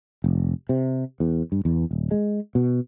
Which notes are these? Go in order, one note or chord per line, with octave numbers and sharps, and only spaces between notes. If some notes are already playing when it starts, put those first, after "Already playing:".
F1
C3
E2
G2
E2
D#1
G#3
B2